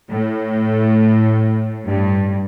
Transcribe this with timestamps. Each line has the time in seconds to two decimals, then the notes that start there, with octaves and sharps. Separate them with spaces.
0.11 A2
1.87 G2